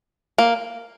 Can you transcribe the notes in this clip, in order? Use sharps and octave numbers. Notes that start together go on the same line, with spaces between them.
A#3